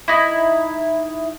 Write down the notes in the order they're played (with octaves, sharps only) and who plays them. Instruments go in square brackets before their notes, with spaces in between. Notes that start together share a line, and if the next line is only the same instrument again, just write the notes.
[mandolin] D#4 E4